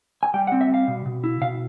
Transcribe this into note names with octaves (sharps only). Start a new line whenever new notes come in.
G#5
G3 G5
F#5
C4
E5
G3 F5
B2
B2
E4
B2 F5